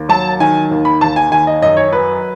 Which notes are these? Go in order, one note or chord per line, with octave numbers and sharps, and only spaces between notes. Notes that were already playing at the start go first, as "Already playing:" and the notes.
Already playing: D#2
F#3 A5
D#3 G#5
D#2
B5
D#2 A5
G#5
D#3 G#5
D#5
F#2 D#5
C#5
F#3 B4